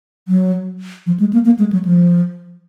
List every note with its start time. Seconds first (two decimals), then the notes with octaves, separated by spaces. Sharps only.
0.28 F#3
1.07 F3
1.20 G#3
1.33 A#3
1.45 A#3
1.59 G#3
1.72 F#3
1.85 F3